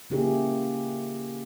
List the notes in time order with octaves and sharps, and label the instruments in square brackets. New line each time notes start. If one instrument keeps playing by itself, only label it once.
[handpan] C#3 A#3 E4 G4 G#4